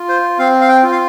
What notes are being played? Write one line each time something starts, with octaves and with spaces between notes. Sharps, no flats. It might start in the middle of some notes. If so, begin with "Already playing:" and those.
Already playing: F4
C5
C4 F5
F5
G5
F4
F5